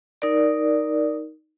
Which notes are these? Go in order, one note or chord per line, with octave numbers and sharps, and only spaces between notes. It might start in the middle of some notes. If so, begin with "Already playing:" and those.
D#4 A#4 D5